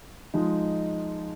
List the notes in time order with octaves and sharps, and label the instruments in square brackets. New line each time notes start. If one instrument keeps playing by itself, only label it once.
[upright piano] F3 G#3 D#4